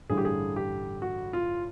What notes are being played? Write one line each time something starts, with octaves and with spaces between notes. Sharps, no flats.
A1 G2 D3 G3 G#4
G4
G#4
G4
F#4
F4